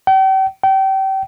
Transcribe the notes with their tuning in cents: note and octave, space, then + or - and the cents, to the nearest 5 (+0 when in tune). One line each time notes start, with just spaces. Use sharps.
G5 -40
G5 -30